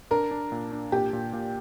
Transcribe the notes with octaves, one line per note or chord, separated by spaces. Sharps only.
D4 A#4
D4
A#2
D4
A#2 G4
A#2
A#2